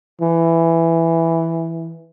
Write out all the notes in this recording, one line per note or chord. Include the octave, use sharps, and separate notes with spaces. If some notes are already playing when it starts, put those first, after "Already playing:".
E3